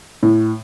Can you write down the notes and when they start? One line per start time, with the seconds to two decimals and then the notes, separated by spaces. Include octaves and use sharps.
0.23 A2